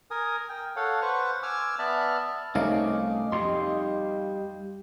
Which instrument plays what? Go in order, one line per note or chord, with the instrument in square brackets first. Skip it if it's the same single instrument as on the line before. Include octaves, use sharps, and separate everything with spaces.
[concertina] A#4 G#5 D#6
G5
A4 C#5 F5 F#5
B4 C5 F#5 C#6
G#5 D6 E6 F6
B3 D5 E5 A5 B5 F6
[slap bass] C2 [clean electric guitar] A3 C#4 [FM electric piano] D#4 F5 D6 [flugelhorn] D#5
[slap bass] F2 [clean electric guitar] G3 C6